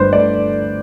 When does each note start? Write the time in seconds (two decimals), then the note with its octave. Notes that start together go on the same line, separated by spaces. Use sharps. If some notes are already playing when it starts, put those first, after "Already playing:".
Already playing: G1 G2 D3 A3 B4 C5
0.13 A3 D5